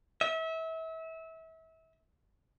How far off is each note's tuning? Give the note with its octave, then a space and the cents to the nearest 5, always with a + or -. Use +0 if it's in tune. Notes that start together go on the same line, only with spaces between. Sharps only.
E5 -30